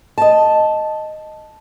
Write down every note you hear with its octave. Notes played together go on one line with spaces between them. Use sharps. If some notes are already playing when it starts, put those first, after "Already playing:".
D#5 A5